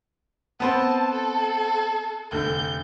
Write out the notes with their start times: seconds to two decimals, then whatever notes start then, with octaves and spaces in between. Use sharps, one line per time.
0.60 B3 C4 C5 A5
1.12 A4
2.32 F1 D3 G6